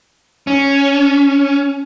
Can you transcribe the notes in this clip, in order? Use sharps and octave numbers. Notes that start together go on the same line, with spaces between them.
C#4